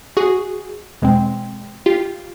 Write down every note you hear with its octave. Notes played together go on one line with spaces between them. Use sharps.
F#4 G#4
E2 B2 G#3 C4
F4 G4